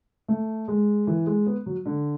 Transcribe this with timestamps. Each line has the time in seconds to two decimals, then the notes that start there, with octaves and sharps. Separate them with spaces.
0.28 A3
0.68 G#3
1.07 E3
1.26 G#3
1.46 B3
1.66 F#3
1.86 D3